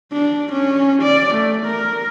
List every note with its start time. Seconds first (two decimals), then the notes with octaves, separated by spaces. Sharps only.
0.12 D4
0.52 C#4
1.02 D5
1.35 A3
1.66 A#4